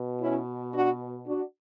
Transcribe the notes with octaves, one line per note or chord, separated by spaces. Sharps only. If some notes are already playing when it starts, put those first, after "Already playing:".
Already playing: B2
C#4 E4
D4 F#4
D4 F#4